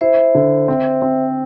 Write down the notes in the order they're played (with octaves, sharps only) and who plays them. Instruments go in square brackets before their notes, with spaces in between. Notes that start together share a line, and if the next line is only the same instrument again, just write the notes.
[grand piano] E4 [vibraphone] C5 E5
[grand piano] D3
C4
C4